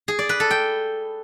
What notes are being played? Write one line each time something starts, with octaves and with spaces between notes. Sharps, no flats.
G#4
D5
B4
A4
G5